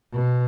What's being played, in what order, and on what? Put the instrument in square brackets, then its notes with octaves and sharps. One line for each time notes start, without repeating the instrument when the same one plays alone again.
[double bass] B2